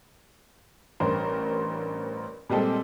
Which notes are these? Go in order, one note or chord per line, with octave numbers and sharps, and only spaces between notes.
A1 G2 A#4 C5
A#2 G3 G#3 C4 A4